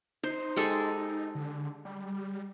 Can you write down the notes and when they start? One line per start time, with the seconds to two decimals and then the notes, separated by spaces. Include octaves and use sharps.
0.24 D#4 C5
0.56 G#3 G4 A4
1.35 D3
1.85 G3